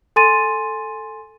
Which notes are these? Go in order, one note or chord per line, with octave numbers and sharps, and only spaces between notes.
A4 G#5 C6 A6 D#7